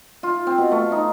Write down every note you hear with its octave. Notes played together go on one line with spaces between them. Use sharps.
F4
C4
B2
A3
D#4